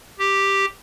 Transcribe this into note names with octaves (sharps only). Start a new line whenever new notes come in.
G4